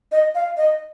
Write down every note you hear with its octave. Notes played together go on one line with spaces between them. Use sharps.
D#5
F5
D#5